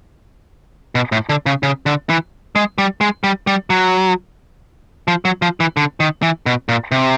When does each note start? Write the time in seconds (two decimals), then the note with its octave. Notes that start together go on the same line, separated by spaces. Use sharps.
0.95 B2
1.12 A2
1.29 D3
1.46 C#3
1.63 C#3
1.86 D3
2.10 E3
2.56 G#3
2.78 G3
3.01 G#3
3.24 G3
3.47 G3
3.70 F#3
5.08 F3
5.25 F#3
5.42 F3
5.60 E3
5.77 D3
6.00 D#3
6.22 E3
6.46 B2
6.69 A#2
6.92 C3